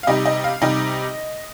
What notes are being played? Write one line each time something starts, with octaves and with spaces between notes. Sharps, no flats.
F5
C3 G3 D#4 D#5
D#5
F5
C3 G3 D#4 D#5